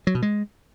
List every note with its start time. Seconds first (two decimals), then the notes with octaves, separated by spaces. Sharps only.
0.07 F#3
0.15 B2
0.22 G#3